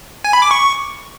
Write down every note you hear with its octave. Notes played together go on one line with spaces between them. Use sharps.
G#5
B5
D6
C#6